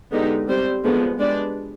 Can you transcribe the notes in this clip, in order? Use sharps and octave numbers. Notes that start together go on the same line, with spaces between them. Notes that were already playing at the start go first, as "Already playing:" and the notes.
D3 G#3 B3 D#4 G4
G3 C4 G4 C5
D3 F3 G#3 B3
G#3 D4 G4 B4 D5